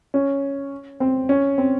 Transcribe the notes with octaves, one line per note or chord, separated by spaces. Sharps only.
C#4
C4
C#4
C4